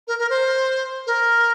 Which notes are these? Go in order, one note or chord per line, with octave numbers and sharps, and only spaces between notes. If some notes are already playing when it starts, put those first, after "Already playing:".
A#4
A#4
C5
A#4